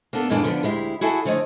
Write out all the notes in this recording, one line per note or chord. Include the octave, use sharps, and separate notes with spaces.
A#3 B3 D4 A4
F#2 A#2 E3 G#3 A#3 D4
D3 F3 B3 C#4 D4
D2 G#3 E4 G4
E4 F#4 G#4 A4 E5
D3 F3 A3 C#5 D#5